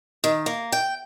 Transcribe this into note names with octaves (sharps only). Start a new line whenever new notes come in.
D#3
A#3
G5